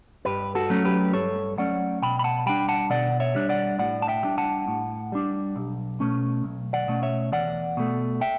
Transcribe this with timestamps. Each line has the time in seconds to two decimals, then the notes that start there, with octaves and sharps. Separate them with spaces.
0.25 G2 G4 B4
0.55 F#4 A4
0.70 F#3 A3 C#4
0.85 G4 B4
1.13 G2 A4 C#5
1.58 F#3 A3 C#4 D5 F#5
2.02 B2 G5 B5
2.19 B5
2.24 F#5 A5
2.46 G3 D4 G5 B5
2.69 F#5 A5
2.90 B2 D5 F#5
3.20 C#5 E5
3.35 G3 D4
3.49 D5 F#5
3.79 A2 D5 F#5
4.02 A5
4.08 E5 G5
4.23 G3 D4
4.38 F#5 A5
4.68 A2
5.12 G3 D4
5.56 B1
6.00 B2 A3 C#4
6.44 B1
6.73 D5 F#5
6.88 B2 A3 C#4
7.03 C#5 E5
7.32 E2 D5 F#5
7.77 B2 A3
8.21 E5 G5